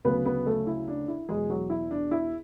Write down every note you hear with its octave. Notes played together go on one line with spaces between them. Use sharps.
D2 C#3 F#3 B3 B4
B3 B4
A3 A4
E4
D4
E4
E2 B2 F#3 G#3 G#4
F#3 F#4
E4
D4
E4